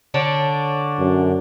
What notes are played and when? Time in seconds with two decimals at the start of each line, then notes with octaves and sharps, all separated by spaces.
0.14 D3 D4 C#5
0.99 F#2